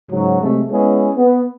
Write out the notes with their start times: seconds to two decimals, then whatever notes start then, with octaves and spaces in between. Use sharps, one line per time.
0.11 G#2 C#3 F#3
0.42 C3 F#3 G#3 A3
0.70 G#3 B3 C#4 E4 G#4
1.15 B3